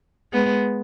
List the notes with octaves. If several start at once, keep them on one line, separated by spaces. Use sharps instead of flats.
G#3 B3